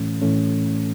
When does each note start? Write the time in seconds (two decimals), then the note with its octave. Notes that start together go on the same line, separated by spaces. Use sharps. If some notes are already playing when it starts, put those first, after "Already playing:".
Already playing: A2 E3 A3 C#4
0.22 A2 E3 A3 C#4